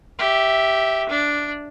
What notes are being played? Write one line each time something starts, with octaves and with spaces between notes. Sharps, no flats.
G4 E5
D4